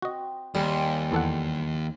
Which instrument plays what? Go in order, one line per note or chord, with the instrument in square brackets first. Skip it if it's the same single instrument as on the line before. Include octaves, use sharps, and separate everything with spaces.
[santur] C4 [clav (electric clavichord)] F#4 D#5
[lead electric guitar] D#2 [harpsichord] G3 [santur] G5 G#5 C6
[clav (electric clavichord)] E2 A4 F#5